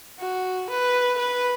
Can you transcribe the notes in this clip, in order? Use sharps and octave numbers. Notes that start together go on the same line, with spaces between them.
F#4
B4
B4